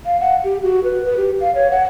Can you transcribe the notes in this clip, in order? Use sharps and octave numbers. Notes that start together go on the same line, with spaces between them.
F5
F#5
G4
F#4
B4
B4
G4
F5
C#5
F#5